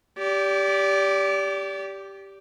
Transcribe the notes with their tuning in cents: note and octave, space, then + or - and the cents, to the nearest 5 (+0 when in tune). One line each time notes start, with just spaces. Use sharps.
G4 +0 D5 -30